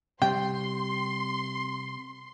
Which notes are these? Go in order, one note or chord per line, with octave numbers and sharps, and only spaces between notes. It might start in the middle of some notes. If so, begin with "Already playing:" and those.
C3 G3 G5 C6